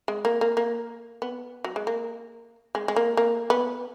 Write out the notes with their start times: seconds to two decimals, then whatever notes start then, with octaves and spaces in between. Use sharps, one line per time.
0.08 G#3
0.25 A#3
0.41 A#3
0.57 A#3
1.22 B3
1.64 F#3
1.76 G#3
1.87 A#3
2.75 G#3
2.88 G#3
2.96 A#3
3.17 A#3
3.50 B3